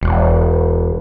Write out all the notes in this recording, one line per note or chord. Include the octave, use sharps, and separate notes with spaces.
E1